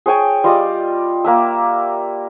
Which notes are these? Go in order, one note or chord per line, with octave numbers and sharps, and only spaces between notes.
G#4 C#5 G5 G#5
G3 F4 D5 D#5
A#3 E5 E6